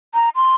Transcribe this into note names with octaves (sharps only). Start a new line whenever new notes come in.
A#5
C6